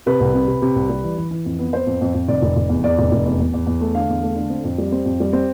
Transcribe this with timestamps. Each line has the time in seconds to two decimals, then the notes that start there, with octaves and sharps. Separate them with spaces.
0.06 C3 B4
0.20 C2
0.34 C3
0.48 C3
0.62 C3
0.76 C2
0.89 G3
1.04 E3
1.17 E3
1.31 E3
1.45 F2
1.59 B3
1.73 B3 C5
1.86 F2
2.01 F2
2.14 F2
2.28 F1 D5
2.42 F1
2.56 F1
2.69 E2
2.84 E2 D5
2.98 F1
3.12 F1
3.25 E2
3.40 E2
3.53 E2
3.66 E2
3.81 A3
3.95 D3 F5
4.09 E2
4.23 A3
4.36 D3
4.50 C4
4.64 F2
4.78 G3
4.92 C4
5.05 F2
5.20 G3
5.33 C4